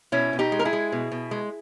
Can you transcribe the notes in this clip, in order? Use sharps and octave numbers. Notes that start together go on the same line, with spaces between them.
B2 C#4 E4
B2
D#4 G4
G#3
A#4
E4 G#4
G#3
B2
B2
G#3